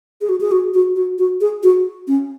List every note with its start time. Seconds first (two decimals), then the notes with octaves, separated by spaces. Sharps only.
0.21 G#4
0.29 F#4
0.41 G#4
0.51 F#4
0.74 F#4
0.96 F#4
1.18 F#4
1.41 G#4
1.63 F#4
2.08 C#4